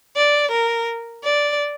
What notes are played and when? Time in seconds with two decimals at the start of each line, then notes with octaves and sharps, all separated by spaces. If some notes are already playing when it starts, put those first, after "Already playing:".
0.16 D5
0.52 A#4
1.24 D5